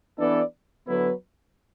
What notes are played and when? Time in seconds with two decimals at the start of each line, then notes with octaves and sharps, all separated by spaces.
0.18 E3 B3 D4 A4 D5
0.86 D3 F#3 B3 E4 B4